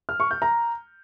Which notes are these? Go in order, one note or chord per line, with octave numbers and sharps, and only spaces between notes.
F6
C#6
G6
A#5